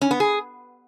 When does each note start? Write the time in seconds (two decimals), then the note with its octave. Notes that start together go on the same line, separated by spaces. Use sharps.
0.01 C#4
0.11 B3
0.20 G#4